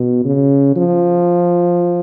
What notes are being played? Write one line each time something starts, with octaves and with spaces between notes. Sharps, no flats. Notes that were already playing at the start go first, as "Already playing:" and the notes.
Already playing: B2
C#3
F3